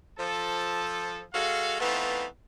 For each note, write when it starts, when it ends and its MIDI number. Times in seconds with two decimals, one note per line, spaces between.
0.19 1.22 53
0.19 1.22 69
1.33 1.78 56
1.33 1.78 66
1.33 1.78 69
1.33 1.78 77
1.80 2.25 52
1.80 2.25 57
1.80 2.25 59
1.80 2.25 60
1.80 2.25 63
1.80 2.25 65